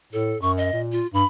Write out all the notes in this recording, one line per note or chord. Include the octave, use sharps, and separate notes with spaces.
A2 A4
F#2 C#6
D#5
A#2
F4
G2 B5